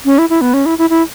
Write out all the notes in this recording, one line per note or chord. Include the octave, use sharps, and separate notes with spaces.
C#4
E4
E4
B3
C#4
E4
E4
E4